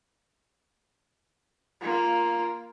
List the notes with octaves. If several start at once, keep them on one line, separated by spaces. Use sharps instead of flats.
A#3 F4